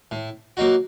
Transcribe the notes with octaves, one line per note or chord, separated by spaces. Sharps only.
A2
F#3 A#3 D#4 F#4